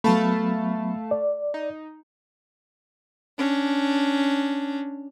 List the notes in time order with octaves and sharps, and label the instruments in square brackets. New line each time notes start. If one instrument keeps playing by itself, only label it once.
[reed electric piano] F#3 B3 B5 [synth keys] A3 F5 A5
[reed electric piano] D5
[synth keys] D#4
[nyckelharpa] C#4 D4